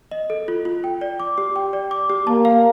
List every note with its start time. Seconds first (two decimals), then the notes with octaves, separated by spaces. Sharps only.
0.11 D#5
0.30 A4
0.48 F4
0.65 F4
0.84 G5
1.01 D5
1.20 D6
1.38 G4
1.56 G5
1.73 D5
1.91 D6
2.10 G4
2.27 A#3 A5
2.45 F5